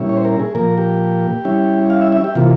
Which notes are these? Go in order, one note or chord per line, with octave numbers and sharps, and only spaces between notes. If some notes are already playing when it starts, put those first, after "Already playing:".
Already playing: A#2 G3 C#4 E4
C#5
C5
A#4
G#4
A#2 F3 A#3 A#4
G4
G3 C#4 E4
F5
E5
E5
G4
C3 E3 A#3 F4